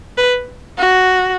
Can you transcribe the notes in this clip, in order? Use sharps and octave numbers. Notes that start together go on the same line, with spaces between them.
B4
F#4